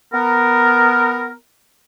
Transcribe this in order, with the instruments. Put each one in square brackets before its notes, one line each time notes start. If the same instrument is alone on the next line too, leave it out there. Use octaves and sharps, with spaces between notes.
[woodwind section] B3 A#4